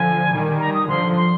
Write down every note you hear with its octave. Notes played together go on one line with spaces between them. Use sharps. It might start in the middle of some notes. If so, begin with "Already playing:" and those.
Already playing: D3 F3 G#5
D#3 G3
A#5
D#6
D3 F3 C6
C6